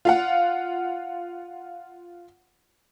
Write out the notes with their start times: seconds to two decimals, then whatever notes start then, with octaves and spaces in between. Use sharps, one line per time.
0.05 F4 F5 F#5